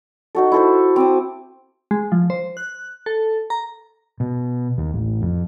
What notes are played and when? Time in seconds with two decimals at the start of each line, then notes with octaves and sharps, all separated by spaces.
0.35 D#4 F#4 A4
0.52 E4 A4 C5
0.96 C4 D6 D#6
1.91 G#3
2.12 F3
2.30 C5
2.57 F#6
3.06 A4
3.50 A#5
4.20 B2
4.78 D#2
4.94 A1
5.22 F2